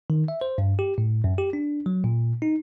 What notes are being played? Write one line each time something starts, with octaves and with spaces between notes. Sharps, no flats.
D#3
E5
C5
G2
G4
A2
F#2
G4
D4
F#3
A#2
D#4